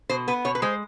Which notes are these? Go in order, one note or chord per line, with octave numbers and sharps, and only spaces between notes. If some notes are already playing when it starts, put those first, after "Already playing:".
B2 C5
B3 B4
B2 C#5
B4
G#3 C5